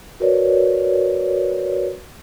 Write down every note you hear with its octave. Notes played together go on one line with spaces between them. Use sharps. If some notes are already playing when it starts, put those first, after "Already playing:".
F#4 A#4 B4 C#5 D5